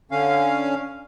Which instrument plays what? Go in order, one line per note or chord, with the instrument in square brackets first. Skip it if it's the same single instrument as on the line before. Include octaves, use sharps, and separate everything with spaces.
[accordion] D3 C#4 F5